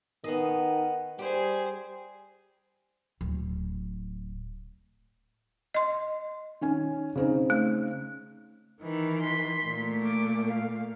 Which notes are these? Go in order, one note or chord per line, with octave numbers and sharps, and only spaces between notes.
D#3 B3 G#4 D#5
G3 G4 G#4 C5
D1
D#5 C6
D#3 C#4 G#5
C#3 C4 D#4
A3
D#3 E3
C6 B6
A#2 A3
D6
F5